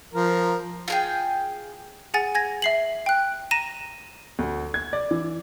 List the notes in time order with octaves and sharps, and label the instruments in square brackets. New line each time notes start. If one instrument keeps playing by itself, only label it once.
[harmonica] F3 A#4
[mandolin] F4 G#4 G5
[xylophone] G#4 F#5 G#5 A6
G#5 G#6 A#6
E5 C7 F#7
G5 F#6
A#5 A#6 D#7 E7
[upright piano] D2
G#6
D5
E3